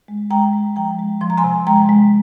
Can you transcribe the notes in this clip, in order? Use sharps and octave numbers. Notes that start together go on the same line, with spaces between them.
G#3
G#3 G5 A#5
G#3
F3 G5 A#5
G#3
F3 C6
A#5
G#5 C6
C3
G#3 G5 A#5
G#3